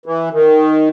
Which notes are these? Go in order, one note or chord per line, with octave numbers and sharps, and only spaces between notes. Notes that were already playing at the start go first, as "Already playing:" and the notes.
E3
D#3